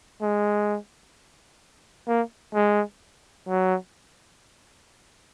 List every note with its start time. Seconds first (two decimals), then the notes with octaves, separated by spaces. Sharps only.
0.22 G#3
2.07 A#3
2.54 G#3
3.48 F#3